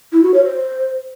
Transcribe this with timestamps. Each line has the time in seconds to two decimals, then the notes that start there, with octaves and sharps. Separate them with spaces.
0.13 E4
0.23 F#4
0.34 C#5
0.45 C5